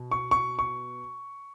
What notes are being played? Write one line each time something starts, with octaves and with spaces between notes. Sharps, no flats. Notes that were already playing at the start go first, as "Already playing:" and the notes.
Already playing: B2
C#6
C#6
C#6